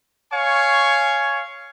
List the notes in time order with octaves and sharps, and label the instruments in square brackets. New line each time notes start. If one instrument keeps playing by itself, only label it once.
[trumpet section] C#5 F5 G#5 C#6